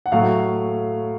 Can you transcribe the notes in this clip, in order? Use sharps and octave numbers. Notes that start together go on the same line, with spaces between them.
F#5
A2 F#3 A3 F5